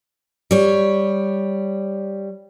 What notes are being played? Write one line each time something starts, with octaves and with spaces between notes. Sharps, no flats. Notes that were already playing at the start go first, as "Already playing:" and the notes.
G3 C#5